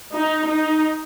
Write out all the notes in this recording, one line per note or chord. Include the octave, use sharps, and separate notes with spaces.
D#4
D#4